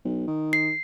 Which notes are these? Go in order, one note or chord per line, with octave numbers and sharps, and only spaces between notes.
B1
D#3
C7